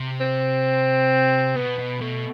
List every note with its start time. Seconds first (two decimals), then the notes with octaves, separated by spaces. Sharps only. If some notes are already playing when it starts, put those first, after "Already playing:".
Already playing: C3
0.20 C4
1.55 B2 B3
1.78 B2
2.01 B2 A3